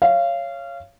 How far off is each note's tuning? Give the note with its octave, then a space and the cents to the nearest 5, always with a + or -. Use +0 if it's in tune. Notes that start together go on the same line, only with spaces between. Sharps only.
C#5 +0 F5 -25